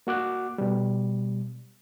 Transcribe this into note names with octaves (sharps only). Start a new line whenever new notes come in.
A#3 F#4 D6 F#6
B2 G3